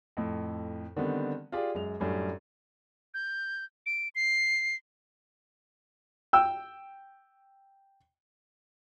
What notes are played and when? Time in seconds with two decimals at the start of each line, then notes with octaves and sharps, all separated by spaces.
0.17 F2 A2
0.96 D3 D#3 G3 B3 C4
1.52 F4 G4 G#4 D5 F5
1.75 F#2 G#3 F7
2.00 F#2 A2 G3 A3 C#4 D4
3.14 G6
3.86 D7
4.15 C7
6.33 G5 E6